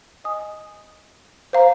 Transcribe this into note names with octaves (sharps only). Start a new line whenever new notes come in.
D#5 G#5 D#6
C5 F5 A#5